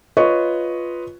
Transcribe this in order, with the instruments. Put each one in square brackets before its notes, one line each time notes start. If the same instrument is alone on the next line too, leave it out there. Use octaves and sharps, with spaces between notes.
[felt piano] F4 B4 C#5 D#5 C#6